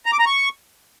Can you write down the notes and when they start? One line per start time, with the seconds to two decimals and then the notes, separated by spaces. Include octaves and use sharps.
0.06 A#5
0.13 D6
0.19 A#5
0.26 C#6